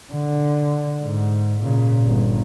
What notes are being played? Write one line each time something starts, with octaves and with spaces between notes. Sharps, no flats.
D3
G#2
A#2 C#3
G1